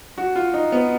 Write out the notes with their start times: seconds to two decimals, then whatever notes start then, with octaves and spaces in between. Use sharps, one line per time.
0.18 F#4
0.36 F4
0.54 D#4
0.72 B3